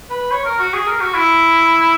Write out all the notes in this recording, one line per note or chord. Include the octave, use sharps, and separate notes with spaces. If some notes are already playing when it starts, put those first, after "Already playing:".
B4
C#5
A#4
F#4
G#4
A#4
F#4
E4